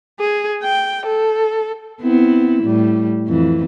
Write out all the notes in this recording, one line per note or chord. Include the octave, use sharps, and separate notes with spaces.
G#4
G5
A4
B3 C4 E4
A2 G3
F2 E3